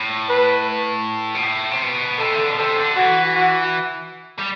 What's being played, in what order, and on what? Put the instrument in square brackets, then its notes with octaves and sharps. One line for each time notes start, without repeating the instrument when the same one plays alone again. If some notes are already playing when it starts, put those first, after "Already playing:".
Already playing: [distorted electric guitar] A2
[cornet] B4
[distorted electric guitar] B2
A2
C3
B2
[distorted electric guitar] C3 [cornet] A4
[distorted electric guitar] E3
D3
B2
[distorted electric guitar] C3 [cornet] A4
[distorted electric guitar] D3
[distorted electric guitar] E3 [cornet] F#4
[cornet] F#4
[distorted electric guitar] G3